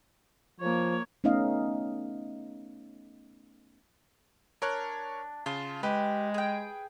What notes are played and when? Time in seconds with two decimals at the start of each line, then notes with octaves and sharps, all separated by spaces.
0.60 F3 A#3 C#5
1.24 A3 B3 C#4 D#4 D#5 F5
4.62 D4 A#4 C#5 F#6
5.46 C#3 F4 A5
5.83 G#3 G4 B4
6.34 G#4 G5